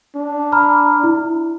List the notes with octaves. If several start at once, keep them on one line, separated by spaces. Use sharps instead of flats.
D4
A#5 B5 F6
E4